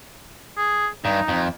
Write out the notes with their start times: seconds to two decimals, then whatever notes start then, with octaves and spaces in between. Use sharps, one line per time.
0.58 G#4
1.05 G2 D#4
1.28 F2